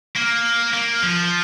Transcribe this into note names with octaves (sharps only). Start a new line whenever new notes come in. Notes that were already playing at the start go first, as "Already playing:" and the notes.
A#3
A#3
F3